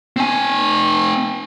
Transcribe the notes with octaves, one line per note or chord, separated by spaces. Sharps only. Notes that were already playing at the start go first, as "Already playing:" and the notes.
C4 G#5